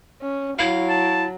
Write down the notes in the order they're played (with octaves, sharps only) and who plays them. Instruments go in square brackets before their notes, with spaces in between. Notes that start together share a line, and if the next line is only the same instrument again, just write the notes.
[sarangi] C#4
[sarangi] F#3 [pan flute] E4 [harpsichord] F5
[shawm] A5